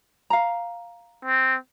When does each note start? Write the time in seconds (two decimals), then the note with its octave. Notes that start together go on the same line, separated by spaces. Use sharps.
0.30 F5 A#5
1.25 C4